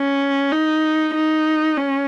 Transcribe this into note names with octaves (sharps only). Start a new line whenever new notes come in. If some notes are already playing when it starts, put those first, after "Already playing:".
Already playing: C#4
D#4
D#4
C#4